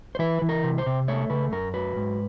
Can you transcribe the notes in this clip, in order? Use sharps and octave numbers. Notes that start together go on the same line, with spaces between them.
C5
E3 B4
E3
A#4
C3
C5
C3
A3 C#5
C#3 B4
F#2 A#4
F#3 B4
G#2